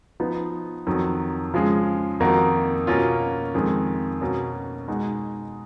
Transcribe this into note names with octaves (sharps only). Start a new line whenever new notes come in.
F3 B3 D#4
F2 D#3 F#3
C#3 F3 G#3
F2 D#3 A#3 D#4 F#4
B2 A#3 C#4 F4
F2 D#3 G#3
B2 A#3 C#4
B2 G#3 D#4 F#4